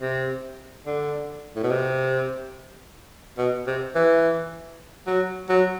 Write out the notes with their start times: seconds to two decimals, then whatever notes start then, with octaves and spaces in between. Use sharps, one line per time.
0.01 C3
0.86 D3
1.56 A2
1.63 B2
1.70 C3
3.38 B2
3.67 C3
3.95 E3
5.06 F#3
5.49 F#3